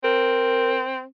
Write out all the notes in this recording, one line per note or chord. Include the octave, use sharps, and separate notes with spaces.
C4 A#4